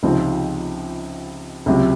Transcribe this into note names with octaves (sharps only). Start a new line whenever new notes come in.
C#2 C3 F3 C4 D#4
C#2 C3 F#3